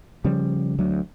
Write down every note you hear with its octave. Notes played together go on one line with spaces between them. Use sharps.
C#3 F3 G3 C#4
D2 F#3